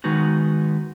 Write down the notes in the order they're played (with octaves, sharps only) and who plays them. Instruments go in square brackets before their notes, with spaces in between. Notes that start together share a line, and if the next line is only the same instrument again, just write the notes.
[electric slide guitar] D#3 G#3 B3 D#4 F#4